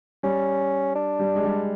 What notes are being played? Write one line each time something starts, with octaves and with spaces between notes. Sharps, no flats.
G3 C#4
D4
G3
G#3
G3